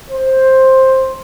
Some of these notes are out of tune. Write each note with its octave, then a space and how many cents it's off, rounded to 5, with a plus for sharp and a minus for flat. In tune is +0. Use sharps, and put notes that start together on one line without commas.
C5 +10